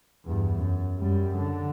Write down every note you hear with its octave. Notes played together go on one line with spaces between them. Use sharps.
E2 G2
F#2
F#2 G3
D3